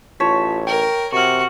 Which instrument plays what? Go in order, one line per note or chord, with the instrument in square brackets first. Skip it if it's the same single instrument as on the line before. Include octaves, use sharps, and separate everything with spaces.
[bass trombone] A1 [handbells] F4 A5 B6 [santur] C#5
[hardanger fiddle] A#4 [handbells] G5
[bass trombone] C3 [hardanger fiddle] F#4 F#5 [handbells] C#6 F6